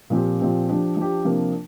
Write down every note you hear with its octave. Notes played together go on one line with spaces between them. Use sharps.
A#2 F3 C4 G4
A#2 F3 C4 G4
F3 D4 G4
F3 D4 G4
C3 F3 A#3 D4